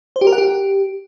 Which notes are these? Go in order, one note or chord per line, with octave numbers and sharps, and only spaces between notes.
C5
G4
A#4
F#5
G4